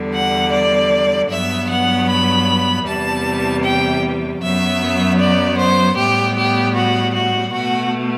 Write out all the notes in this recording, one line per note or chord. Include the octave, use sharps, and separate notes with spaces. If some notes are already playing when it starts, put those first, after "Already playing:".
Already playing: E2 D3 G3
F#5
D5
G2 F#3 B3 E5
F#5
B5
E2 C3 E3 G3 A5
G5
F#2 F#3 B3 E5
D5
C5
A2 G3 B3 G4
G4
F#4
F#4
B2 A3 F#4